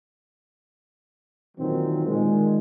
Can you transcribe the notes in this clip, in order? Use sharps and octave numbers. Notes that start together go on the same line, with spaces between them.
A#2 D#3 E3 F#3 C4
A#2 D#3 G#3